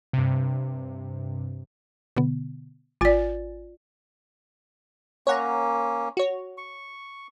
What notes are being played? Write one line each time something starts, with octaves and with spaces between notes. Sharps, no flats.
G2 C3
B2 D3 B3
G#1 F4 D5 G#5 A6
A#3 C#4 C#5 F#5 A#5
F#4 C#5
C#6